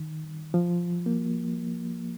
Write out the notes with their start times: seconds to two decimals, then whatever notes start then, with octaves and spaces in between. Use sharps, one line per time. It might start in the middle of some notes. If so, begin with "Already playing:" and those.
Already playing: D#3
0.54 F3
1.06 A#3